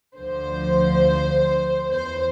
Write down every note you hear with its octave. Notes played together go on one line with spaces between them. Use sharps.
D2 D3 F3 C5
E2 E3 C5